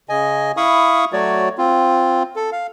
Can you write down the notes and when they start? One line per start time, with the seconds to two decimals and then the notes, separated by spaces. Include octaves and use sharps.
0.09 C#3 D#5 G#5
0.57 E4 F5 B5 C#6 D#6
1.13 F#3 A3 F#4 C#5 D5
1.58 C4 F4
2.36 A4
2.52 F5